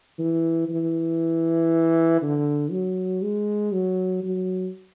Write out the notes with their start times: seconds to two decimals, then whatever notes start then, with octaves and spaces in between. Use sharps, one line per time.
0.19 E3
0.69 E3
2.22 D3
2.71 F#3
3.22 G#3
3.72 F#3
4.23 F#3